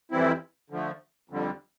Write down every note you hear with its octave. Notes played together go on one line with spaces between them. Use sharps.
F2 E3 G3 C4 E4
D3 F3 A3
F2 D3 G3